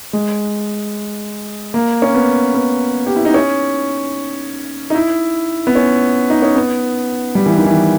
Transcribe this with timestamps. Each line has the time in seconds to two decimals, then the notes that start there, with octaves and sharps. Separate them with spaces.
0.13 G#3
1.74 A#3
2.02 C#4
2.14 B3
2.55 B3
3.07 G4
3.16 E4
3.25 D#4
3.34 C#4
4.90 D#4
4.95 E4
5.67 B3
5.75 C#4
6.30 D#4
6.42 C#4
6.56 B3
7.35 G3
7.46 E3
7.57 D#3
7.66 E3